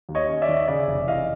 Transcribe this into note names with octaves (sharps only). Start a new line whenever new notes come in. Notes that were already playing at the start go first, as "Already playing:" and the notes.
D#2
C#5 D#5
C#4
D5 E5
D#3
C#3 D5 E5
F1
E3 D#5 F5